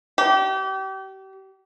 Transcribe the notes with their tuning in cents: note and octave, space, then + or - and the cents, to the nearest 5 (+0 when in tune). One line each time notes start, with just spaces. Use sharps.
G4 -35